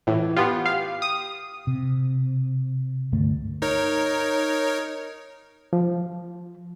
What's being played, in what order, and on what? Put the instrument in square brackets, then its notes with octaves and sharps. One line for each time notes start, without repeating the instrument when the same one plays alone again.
[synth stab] A2 [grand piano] E3
[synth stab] B3 F4 [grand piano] G4
[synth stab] F5
D#6
[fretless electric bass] C3
C#2 G2 D3 A3
[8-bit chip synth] D#4 A#4 C#5
[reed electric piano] F3